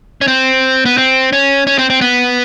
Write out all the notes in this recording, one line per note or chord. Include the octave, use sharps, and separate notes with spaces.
C#4
C4
B3
C4
C#4
C#4
C4
C4
B3